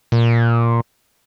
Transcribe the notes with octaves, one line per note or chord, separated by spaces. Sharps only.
A#2